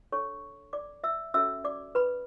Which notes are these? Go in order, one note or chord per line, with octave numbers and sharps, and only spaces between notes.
D4 A4 C#5 C#6
D5 D6
E5 E6
C#4 F#4 A4 C#5 E5 E6
D5 D6
B4 B5